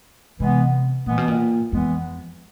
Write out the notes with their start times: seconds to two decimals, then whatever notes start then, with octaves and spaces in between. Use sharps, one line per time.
0.40 C3 E3 G#3 B3
1.06 A#2 E3 G#3 B3
1.18 B2
1.28 A#2
1.72 F2 E3 G#3 B3